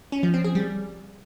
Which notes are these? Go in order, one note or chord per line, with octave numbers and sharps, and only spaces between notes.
C#4
F3
C4
G#4
G3